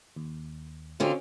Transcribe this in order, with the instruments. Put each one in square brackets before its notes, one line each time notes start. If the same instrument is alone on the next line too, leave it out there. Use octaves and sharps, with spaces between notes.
[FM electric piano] D#2
[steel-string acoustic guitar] F2 D3 F4 [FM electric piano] C4 C#4 [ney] F#4